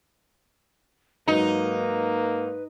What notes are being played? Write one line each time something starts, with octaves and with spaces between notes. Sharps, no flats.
G#2 F#3 A#3 D#4 B4